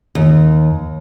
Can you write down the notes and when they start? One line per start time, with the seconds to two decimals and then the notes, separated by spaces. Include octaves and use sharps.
0.15 D#2